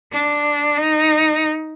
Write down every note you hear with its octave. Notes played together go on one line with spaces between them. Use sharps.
D4
D#4